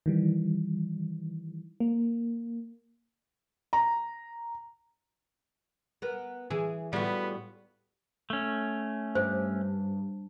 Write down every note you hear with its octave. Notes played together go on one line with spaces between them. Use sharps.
D#3 E3 G3
A#3
A#5
B3 A#4
E3 G#4
A2 G3 B3 F4 F#4
A3 C#4
G2 C5